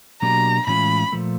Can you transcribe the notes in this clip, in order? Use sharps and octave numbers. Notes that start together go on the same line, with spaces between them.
B2 F#3 A#3 D4 G4 A#5
A2 E3 G#3 C#4 F4 B5
A#2 F3 A3